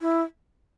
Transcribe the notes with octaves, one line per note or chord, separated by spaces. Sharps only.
E4